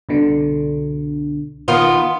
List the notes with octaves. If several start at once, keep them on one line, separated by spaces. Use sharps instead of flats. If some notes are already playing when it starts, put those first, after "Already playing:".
C2 B2 D3
D#3 B3 F4